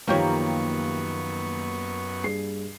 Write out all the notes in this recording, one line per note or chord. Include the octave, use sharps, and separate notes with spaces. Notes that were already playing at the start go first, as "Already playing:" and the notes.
F#2 D#3 F3 A#3 B3 G4 C#5 C#6
G2 G#4 C7